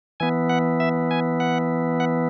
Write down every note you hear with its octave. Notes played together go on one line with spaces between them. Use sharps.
E3 B3 G#5
F#5
E5
G#5
F#5
F#5